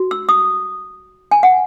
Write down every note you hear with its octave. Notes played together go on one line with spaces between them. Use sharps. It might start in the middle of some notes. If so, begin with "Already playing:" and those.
Already playing: F#4
E6
D#6
G#5
F#5